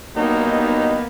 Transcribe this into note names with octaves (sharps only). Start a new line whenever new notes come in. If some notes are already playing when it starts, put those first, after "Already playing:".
G2 F#3 A#3 B3 D#4